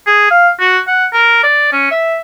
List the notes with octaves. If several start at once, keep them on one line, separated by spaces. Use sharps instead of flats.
G#4
F5
F#4
F#5
A#4
D5
C#4
E5